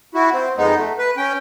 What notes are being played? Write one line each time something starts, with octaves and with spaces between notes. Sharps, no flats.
E4 F#4
C4
F2 G#3 B3 D#4
A3
B4
C#4 G5